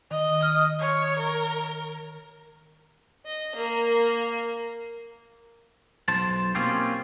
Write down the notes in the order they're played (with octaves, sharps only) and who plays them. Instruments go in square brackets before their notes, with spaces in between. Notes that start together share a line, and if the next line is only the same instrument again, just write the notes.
[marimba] D#3 [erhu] D#5
[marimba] D#6 F6
[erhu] C#5
A#4
[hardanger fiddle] D#5
A#3 A#4
[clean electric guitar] B1 C5 A5
A#3 C4 C#4 F4 G4 C5